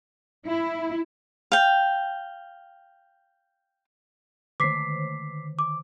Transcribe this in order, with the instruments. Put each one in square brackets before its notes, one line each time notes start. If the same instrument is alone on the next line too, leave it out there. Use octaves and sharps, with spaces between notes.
[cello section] E4
[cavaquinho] F5 G5
[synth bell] D3 D#3 [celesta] D6 B6 C7
[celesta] D6